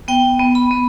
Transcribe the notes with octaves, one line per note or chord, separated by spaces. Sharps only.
B3 G5
B3
B5
B3